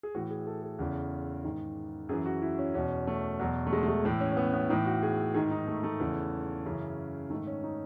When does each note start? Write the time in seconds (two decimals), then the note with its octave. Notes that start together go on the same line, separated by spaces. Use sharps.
0.03 G#4
0.15 A2 E3 F#4
0.30 G#4
0.47 A4
0.63 A4
0.79 E2 C#3 E3
1.44 G#2 D#3
2.09 F#2 G#4
2.13 E3
2.26 F#4
2.42 E4
2.59 C#4
2.74 E2 B2 C#4
3.07 A3
3.39 E2 F#3
3.43 B2
3.67 A3
3.73 G#3
3.83 A3
3.88 G#3
4.05 A2 E3 A3
4.21 C#4
4.32 C#4
4.37 B3
4.54 B3
4.69 A2 E3 D#4
4.86 F#4
5.03 G#4
5.34 G#2 D#3 G#4
5.51 D#4
5.68 A3
5.84 A3
6.00 E2 C#3 E3
6.66 F#2 C#3 E3
7.30 G#2 D#3 A3
7.47 C#4
7.63 D#4